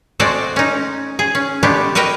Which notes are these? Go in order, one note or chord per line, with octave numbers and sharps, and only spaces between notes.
G#3 A3 C4 F#4 C5 D5
C#4 D#4
G#4
C#4
G#3 A3 B3 D4 G4
F#4 A#4 B4 D#5 G5